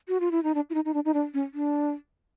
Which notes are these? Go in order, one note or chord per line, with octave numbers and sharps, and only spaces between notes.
F#4
F4
E4
D#4
D4
E4
D#4
D#4
D4
D#4
D4
C#4
D4